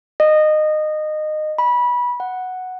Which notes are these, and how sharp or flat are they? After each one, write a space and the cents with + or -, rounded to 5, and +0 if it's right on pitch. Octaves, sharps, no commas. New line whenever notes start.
D#5 -20
B5 -20
F#5 +0